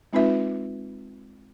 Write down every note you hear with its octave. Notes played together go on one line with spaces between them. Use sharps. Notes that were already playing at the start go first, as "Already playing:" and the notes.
G#3 C4 D#4 F4 B4 E5